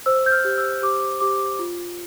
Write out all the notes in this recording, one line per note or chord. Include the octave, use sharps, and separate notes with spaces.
C5 E6
G6
F6
G4
E6
G4 D6
G4 D6
F4